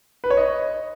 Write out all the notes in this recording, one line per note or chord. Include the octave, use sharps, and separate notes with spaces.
B4
C#5
D#5